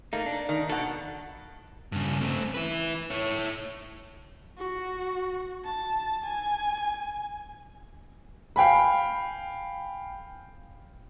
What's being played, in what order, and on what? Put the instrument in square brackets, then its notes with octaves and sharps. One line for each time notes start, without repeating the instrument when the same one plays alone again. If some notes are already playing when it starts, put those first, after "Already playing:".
[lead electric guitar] A3 D#4 [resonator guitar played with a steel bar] A#3
[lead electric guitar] D4
[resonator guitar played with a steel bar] D#3
[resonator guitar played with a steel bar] B2 F#5 [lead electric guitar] A4
[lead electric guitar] G2 C#3
A3 C4
E4 B4
E4 C#5
[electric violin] F#4
A5
G#5
[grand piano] F5 G5 G#5 B5